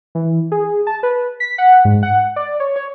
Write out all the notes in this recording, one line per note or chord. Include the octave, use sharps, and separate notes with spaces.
E3
G#4
A5
B4
B6
F#5
G#2
F#5
D5
C#5
C#5